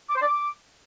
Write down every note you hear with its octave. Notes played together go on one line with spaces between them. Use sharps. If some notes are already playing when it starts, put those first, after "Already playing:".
D6
C5
D5
D6